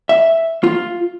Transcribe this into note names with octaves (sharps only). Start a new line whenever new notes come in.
E5
F4